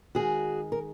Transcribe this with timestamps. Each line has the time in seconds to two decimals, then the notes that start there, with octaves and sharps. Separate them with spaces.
0.15 D#3 G#3 F#4 G#4
0.72 A#4